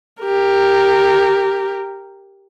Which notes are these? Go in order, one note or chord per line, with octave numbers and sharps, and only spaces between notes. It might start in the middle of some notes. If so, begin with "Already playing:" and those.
G4 A#4